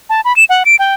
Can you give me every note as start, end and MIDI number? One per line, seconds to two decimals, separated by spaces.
0.10 0.21 81
0.25 0.35 83
0.36 0.44 100
0.49 0.63 78
0.65 0.76 98
0.79 0.95 79